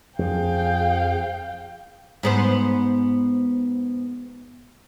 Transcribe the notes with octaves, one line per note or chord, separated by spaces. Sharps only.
F2 F3 G#4 F5 G5
G#2 B3 C5